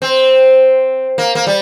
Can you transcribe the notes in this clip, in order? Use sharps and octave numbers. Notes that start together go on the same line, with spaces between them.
C4
A#3
A#3
G3